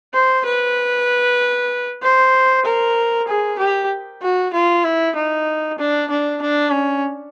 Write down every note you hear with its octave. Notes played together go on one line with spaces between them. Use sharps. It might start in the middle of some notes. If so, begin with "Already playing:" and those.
C5
B4
C5
A#4
G#4
G4
F#4
F4
E4
D#4
D4
D4
D4
C#4